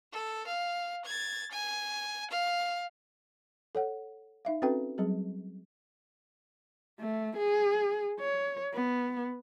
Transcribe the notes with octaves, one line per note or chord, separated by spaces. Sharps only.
A4
F5
G#6 A6
G#5
F5
A4 C#5 F#5
D#4 E5 F5
C4 C#4 F#4 A4 B4 G5
F#3 G3 C4 G#4
A3
G#4
C#5
B3